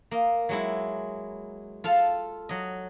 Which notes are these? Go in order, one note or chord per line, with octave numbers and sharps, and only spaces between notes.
A#3 D#5
F#3 G#3 E4
F4 A4 F5 A5
F#3 D#5